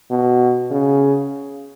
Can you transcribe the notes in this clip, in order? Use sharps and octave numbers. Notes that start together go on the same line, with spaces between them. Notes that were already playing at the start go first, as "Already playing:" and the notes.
B2
C#3